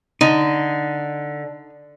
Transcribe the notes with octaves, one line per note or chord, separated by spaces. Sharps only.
D3 D#4